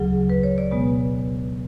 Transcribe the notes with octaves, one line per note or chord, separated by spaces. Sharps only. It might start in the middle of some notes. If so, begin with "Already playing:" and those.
Already playing: D2 C#3 F#3 G#4
B4
C#5
D5
B2 G#3 B3